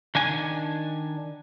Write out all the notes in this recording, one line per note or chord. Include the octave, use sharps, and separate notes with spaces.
D#3 D4 G#5